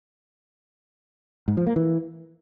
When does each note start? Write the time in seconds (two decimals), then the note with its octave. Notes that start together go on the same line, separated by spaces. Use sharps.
1.48 G#2
1.57 F3
1.67 A#3
1.76 E3